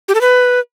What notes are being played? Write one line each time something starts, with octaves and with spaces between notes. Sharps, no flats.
G4
A4
B4